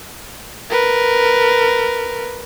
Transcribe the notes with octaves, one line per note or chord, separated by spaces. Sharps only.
A#4 B4